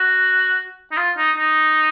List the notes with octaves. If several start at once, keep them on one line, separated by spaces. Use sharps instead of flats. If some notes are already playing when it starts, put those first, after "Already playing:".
Already playing: F#4
D#4
F4
D#4
D#4